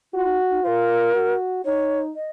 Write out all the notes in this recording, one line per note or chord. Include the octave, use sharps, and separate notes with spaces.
F4 F#4
D#4
D#4
F4 A#4 C5
F#4
D#4 C#5
D#5